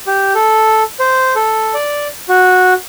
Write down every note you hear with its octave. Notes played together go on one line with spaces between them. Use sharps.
G4
A4
C5
A4
D5
F#4